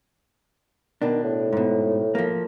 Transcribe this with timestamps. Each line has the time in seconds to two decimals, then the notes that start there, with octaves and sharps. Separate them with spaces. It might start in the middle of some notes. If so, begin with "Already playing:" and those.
1.02 B2 D#3 D4
1.24 A2
1.53 G#2 B2
2.15 F3 A#3